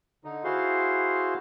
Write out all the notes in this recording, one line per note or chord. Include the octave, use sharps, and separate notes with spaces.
D3 D#4
E4 F#4 G#4 C5 F5 C6